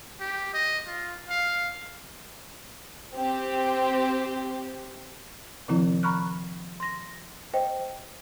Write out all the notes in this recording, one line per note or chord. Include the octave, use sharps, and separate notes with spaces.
G4
D#5
F4
F5
C4 G4
C3 D#3 F3 C4 E4
A#5 B5 C#6 F6 F#6
C6 A#6
C5 D#5 G5